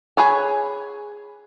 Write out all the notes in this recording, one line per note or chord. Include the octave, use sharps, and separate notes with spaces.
G#4 B4 C#5 G#5